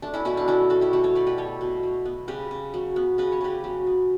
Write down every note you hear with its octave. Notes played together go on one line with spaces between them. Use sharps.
A3 D4
C#4 E4
B2 C#4 E4
D4
A3 C#4 E4
B2 F#4 A4
E4 G4
A3 F#4 A4
A4 C#5
B2 B4 D5
G4 B4
A3 A4 C#5
B2
F#3
B3
C#3 G4 B4
C#3
F#3
B3
C#3 B4
C#5
C#3 G4 B4
F#3
B3